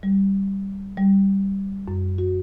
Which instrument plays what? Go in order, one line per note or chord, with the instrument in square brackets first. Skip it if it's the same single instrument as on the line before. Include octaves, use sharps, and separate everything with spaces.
[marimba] G3
G3
F#2
F#4